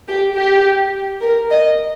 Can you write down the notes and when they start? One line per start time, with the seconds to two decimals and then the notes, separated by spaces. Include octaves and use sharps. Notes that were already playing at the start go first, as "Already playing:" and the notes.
0.08 G4
0.36 G4
1.22 A#4
1.51 D#5